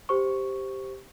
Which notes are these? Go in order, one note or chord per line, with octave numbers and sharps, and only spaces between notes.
G4 C5 C#6